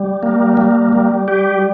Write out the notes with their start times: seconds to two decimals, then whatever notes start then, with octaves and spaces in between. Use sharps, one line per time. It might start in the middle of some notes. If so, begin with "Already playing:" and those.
Already playing: G3
0.23 A#3
0.57 G3
0.92 G3
1.28 G4